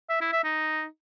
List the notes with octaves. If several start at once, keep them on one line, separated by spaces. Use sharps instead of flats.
E5
E4
E5
D#4